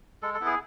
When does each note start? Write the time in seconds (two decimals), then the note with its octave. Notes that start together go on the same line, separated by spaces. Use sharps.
0.22 G#3 A4
0.34 A4
0.40 B3 E4
0.46 G#4